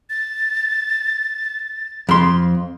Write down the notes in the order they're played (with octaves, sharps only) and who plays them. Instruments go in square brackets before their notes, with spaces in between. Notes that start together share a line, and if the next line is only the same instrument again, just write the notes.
[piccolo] A6
[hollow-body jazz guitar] F2 C6